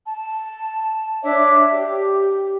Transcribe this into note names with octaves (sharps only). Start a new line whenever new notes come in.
A5
D4 C#5 E5 D6
G4